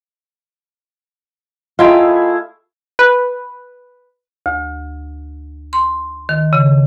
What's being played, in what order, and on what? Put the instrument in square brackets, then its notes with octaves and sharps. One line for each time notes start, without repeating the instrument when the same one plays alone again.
[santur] A3 E4 G#4 [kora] F4 [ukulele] D#5 G5 A#5
[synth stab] B4
[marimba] D2
C6
D#3
C#3